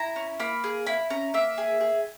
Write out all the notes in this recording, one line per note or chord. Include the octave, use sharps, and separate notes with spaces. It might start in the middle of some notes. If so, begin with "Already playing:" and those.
Already playing: E4 A#5
C#4
A#3 B5
G#4
E4 B5
C#4 A#5
A#3 E5
G#4
G#4